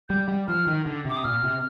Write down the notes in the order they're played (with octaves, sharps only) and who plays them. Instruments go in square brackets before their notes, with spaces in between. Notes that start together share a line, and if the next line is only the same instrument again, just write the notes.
[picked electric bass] G3 [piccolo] G6
[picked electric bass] G3
[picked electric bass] F3 [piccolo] F6
[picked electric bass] D#3
D3
[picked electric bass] C3 [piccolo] D6
[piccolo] D#6
[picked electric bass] A#2 [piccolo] F6
[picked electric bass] C3